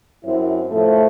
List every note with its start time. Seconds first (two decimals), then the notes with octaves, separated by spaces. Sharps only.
0.23 F#2 C4 E4
0.71 A2 F3 A3